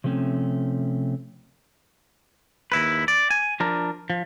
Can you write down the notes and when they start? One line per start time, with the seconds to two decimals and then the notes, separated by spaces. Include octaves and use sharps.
0.04 C3 F3 A3 C4 C#4
2.72 D#2 E4 B4
3.08 D5
3.30 G#5
3.60 F3 D4 A#4
4.10 F3